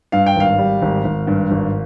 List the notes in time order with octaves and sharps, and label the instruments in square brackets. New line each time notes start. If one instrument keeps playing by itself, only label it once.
[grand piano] G2 F5
G5
G#1 F5
G3
G#1
G#1
G2
G#1